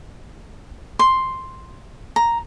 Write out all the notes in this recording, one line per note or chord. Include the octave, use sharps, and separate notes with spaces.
C6
A#5